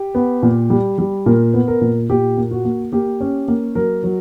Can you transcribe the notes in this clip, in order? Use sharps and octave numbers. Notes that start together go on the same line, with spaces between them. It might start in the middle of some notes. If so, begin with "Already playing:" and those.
Already playing: G4
B3
A#2
G3
G3
A#2 A#4
B3
A#4
A#2
A#2 G4
A#3
F#4
A#3
A#3 G4
C#4
A#3
F#3 A#4
F#3